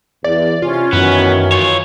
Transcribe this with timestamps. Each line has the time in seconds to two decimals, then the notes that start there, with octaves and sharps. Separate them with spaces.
0.24 E2 D5
0.62 C3 C#4 F4
0.93 F#2 D#3 E3 F#3 B3
1.52 F4 C#5